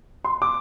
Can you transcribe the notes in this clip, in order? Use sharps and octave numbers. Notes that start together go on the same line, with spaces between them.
C6
D6